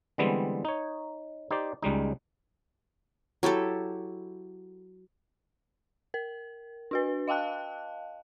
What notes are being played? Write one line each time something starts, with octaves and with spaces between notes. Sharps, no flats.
D3 E3 G3 G#3 B3 C4
D#4 C#5
D#4 G4 C5 D5
C#2 G3 G#3 D#4
F#3 E4 G4 A4
A#4
D4 F#4 B4
D#5 F5 G5 A5 F#6